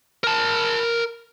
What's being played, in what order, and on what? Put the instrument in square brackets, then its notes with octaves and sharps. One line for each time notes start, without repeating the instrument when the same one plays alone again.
[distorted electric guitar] A#4 A5